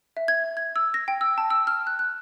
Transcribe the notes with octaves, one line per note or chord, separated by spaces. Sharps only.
E5
G#6
G#6
E6
A#6
G5
E6
A5
E6
F6
F#6
F#6